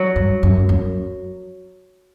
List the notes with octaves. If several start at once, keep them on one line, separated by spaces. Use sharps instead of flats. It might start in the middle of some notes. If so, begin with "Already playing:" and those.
Already playing: F#3
G2
F#2
F#2